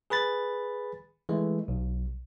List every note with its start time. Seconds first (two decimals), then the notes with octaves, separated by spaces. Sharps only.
0.10 G#4 B4 B5 A6
1.29 E3 G#3 A3
1.68 B1